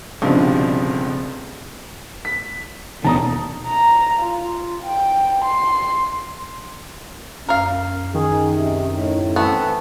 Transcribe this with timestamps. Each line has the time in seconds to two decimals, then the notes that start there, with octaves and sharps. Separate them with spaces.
0.22 F1 C#2 G2 B2 D3 F3
2.25 B6
3.04 D#2 B2 D#3 A5 A#5 D#6
3.67 A#5
4.20 F4
4.84 G5
5.45 C6
7.49 F#2 A#4 F5
8.14 D#3 G#4
8.51 C3
8.93 A2
9.36 E3 A3 B3 C4 A4